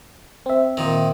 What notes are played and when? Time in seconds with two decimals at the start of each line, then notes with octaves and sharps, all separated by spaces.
0.46 C4 E5
0.77 A#2 D#3